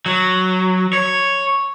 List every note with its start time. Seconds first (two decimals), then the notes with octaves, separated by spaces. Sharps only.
0.06 F#3
0.93 C#5